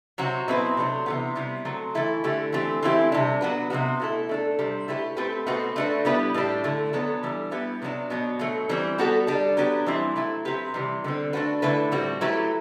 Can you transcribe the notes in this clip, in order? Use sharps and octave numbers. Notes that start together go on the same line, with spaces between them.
C3 F#3 C4 F#4
B2 F#3 C4 E4 B4
C3 F#3 A3 D4
C3 E3 B3
C3 G3 B3 E4
F#3 A3 C4
E3 A3 E4 A4
D3 A3 E4 G4
E3 A3 C4 G4
E3 A3 C4 E4 G4
C3 G3 D4
F#3 B3 F#4 B4
C3 E3 B3 F#4
B2 A3 E4 A4
A3 D4 A4
C3 G3 C4
A3 E4 G4 B4
A3 C4 G4 B4
B2 A3 C4 F#4 B4
A3 D4 F#4 B4
G3 B3 E4 G4 B4
A2 G3 D4 G4
D3 A3 E4
F#3 B3 D4 A4
E3 G3 D4
G3 B3 E4 G4 B4
C3 F#3 B3 D4
B2 F#3 B3 D4
B2 F#3 A3
E3 G3 C4
G3 B3 F#4 A4
G3 D4 A4
F#3 B3 D4 G4 B4
E3 G3 C4 E4
F#3 A3 E4
F#3 C4 G4 B4
C3 E3 G3
D3 G3 C4
A3 D4 F#4 B4
D3 A3 E4 B4
A2 G3 C4 F#4
F#3 A3 E4 G4 B4